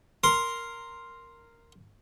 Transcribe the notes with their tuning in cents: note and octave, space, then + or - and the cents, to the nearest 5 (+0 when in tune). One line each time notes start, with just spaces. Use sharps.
A#4 -5 C6 +0